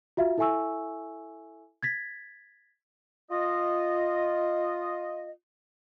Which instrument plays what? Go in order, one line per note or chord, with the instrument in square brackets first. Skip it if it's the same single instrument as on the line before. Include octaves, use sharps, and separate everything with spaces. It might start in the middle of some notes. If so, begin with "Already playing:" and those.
[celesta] F4 F#4 E5 F5
E4 A4 E5 G#5 C#6 E6
G#6 A6 B6
[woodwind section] F4 D#5